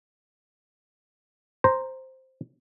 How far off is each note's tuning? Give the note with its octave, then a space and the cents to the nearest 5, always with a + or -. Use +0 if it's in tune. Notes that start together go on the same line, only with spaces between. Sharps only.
C5 +0 A#5 +0